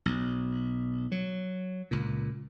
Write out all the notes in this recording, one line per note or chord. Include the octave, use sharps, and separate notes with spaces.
B1
F#3
C#2 A#2